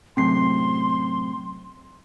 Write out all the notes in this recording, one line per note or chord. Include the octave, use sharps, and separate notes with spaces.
F#2 A2 C3 C4 C6 C7